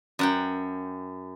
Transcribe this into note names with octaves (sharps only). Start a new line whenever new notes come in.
F#2 F#5 G5